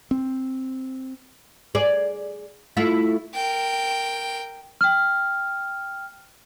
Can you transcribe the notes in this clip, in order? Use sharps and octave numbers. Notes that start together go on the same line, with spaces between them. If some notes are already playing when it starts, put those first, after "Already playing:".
C4
G#4 D5
A3 E4 F4
A#4 G5
G5 F6